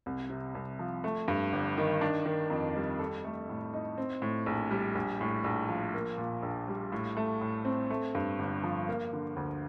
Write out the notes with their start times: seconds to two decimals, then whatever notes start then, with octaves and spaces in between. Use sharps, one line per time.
0.06 C2
0.30 C3
0.55 C2
0.79 F3
1.04 A3
1.28 G2
1.52 G1
1.77 D#3
2.01 D4
2.26 D#3
2.50 F2
2.76 G3
2.99 A4
3.24 A3
3.49 A2
3.74 D#4
3.98 C4
4.22 A2
4.46 A#1
4.71 G3
4.95 A#1
5.21 A2
5.44 A#1
5.69 F3
5.94 A#3
6.18 A#2
6.43 A#1
6.68 G3
6.92 A2
7.17 A3
7.41 A2
7.65 C4
7.90 A3
8.15 G2
8.39 G1
8.64 F3
8.88 A#3
9.13 D3
9.36 D2